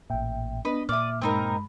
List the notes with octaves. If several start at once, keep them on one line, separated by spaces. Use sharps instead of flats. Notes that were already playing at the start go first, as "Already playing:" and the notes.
A1 A#2 E5 G5
B3 D4 B4 D#5
A#2 D5 E5 D6 D#6 F6
G2 G#3 C4 D#4 A#4 B5